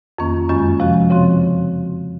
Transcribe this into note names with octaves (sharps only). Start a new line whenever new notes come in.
F2 D#3 A#3 C#4
F#2 D#3 G#3 C#4 F4
C3 F3 G#3 C#4 F#4
C#3 F3 C4 F#4